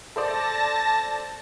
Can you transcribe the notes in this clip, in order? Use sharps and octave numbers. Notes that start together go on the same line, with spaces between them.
A4 C5 D5 A5 A#6